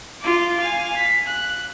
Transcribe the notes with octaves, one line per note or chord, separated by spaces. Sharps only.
F4 D6
F5 G#5
B6
F#6